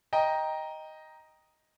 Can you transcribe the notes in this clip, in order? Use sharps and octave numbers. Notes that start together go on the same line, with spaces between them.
D#5 G5 A#5